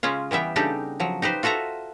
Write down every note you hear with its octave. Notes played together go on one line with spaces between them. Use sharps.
C#3 G#3 C#4 F4
E3 G3 B3 E5 G5
C#3 G3 D4 D#4 G4 A4
F3 F#3
D#4 G4 B4 C5
F4 F#4 A4 E5 A#5